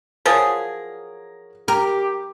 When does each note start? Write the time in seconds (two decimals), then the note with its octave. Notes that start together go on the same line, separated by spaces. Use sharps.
0.26 F3 F#3 G#4 A#4 C#5
1.68 G4 A#4